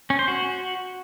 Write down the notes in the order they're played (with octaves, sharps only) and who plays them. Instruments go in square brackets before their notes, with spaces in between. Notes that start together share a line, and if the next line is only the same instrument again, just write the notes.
[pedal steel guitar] C#4
C5
F#4